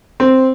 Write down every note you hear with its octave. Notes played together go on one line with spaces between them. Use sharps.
C4